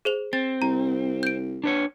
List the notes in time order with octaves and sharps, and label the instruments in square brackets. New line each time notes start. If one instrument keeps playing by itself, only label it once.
[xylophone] G#4 C5 F7
[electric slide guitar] C4 [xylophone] A6
[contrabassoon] C2 [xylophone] A#5
[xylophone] G6 D7
[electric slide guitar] D4 B4 C#5